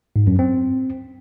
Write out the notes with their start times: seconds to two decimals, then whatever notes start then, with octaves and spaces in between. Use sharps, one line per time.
0.16 G#2
0.27 F#2
0.39 C4